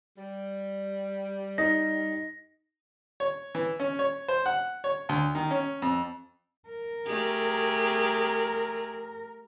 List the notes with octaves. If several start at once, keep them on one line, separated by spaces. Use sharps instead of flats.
G3
D#4 A#6
C#5
E3
C#4
C#5
C5
F#5
C#5
D2
D#3
C#4
F2
A#4
A3 G4 G#4